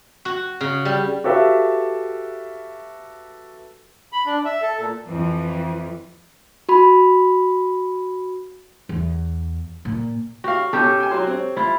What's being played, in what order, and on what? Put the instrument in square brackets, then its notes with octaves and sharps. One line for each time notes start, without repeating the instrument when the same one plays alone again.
[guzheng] F#4
C#3
G3
[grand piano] F#4 G4 A4 B4 E5 F5
[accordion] B5
D4
E5
A4
A#2
[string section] F2 E3
[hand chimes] F#4 B5
[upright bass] E2
A#2
[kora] F#4 [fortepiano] G4 F5
[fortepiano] B2 C#4 [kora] G4 A4
[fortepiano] G5 G#5
F#3 F#4 C6
C4 C#5
[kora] E4 F4